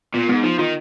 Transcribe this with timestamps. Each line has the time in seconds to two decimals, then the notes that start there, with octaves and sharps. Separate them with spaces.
0.14 A#2 B3
0.29 G#2 B3
0.44 F3 D#4
0.59 D#3 F4